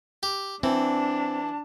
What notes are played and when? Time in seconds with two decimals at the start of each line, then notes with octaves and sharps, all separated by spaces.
0.23 G4
0.63 E3 C4 D4 A5